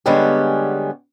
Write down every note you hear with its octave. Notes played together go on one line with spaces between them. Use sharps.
D3 G3 G#3 B3 C#4 G4